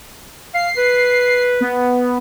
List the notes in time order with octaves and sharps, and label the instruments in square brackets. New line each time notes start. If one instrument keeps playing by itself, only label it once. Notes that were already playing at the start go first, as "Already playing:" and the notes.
[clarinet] F5 [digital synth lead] C7
[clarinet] B4
[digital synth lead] B3